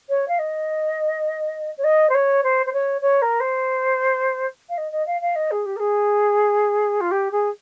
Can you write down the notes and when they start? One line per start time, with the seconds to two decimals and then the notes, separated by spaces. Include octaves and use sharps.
0.09 C#5
0.28 F5
0.39 D#5
1.77 C#5
1.84 D#5
2.09 C5
2.14 C#5
2.43 C5
2.66 C5
2.73 C#5
3.01 C#5
3.22 A#4
3.40 C5
4.69 F5
4.77 D#5
4.92 D#5
5.06 F5
5.21 F5
5.35 D#5
5.51 G#4
5.65 G4
5.76 A#4
5.79 G#4
7.00 F4
7.11 G4
7.31 G#4